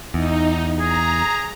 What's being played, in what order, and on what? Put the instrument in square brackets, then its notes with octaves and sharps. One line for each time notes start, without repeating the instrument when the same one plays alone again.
[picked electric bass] E2 [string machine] D#4
[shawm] G#4 [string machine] A#5